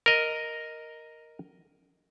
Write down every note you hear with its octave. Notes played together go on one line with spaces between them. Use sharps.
A#4 D#5